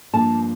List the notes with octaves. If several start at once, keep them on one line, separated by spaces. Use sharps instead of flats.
G2 F3 A#3 D4 A5